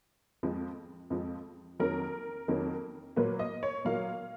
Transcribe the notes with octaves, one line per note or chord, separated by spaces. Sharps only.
F2 F3 G#3
F2 F3 G#3
F2 D#3 F#3 A#3 A#4
F2 D#3 F#3 A#3
A#2 F#3 A#3 B4
D#5
C#5
A#2 F#3 A#3 F5